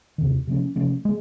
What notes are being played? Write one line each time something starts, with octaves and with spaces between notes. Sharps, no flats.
E2 C3 D#3
C3 F3 A3 C#4
C3 F3 A3 C#4
G#3